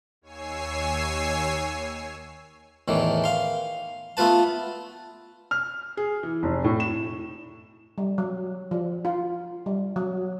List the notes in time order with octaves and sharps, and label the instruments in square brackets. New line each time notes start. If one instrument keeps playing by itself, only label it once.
[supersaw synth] D#2 C#5 G#5 E6 C7
[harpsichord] E2 A2 D#3 E3
F5 C6
A3 B3 F4 B4 A5
[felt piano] F6
G#4
E3
F1
A2
E7
[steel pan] G3
F#3
F3
F4
G3
F#3